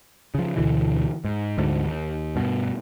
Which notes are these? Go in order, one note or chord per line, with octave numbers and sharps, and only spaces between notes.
C#3 F3
D2 B2 D3 E3
G#2
D2 G#2 D3
D#2
G2 B2